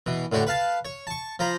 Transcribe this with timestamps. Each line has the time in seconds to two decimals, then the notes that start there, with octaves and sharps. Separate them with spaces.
0.06 B2 E3
0.32 A2 D3 F#4 G4
0.47 B4 F5 A5
0.85 C#5
1.07 A5 C#6
1.39 F3 C5 A#5 B5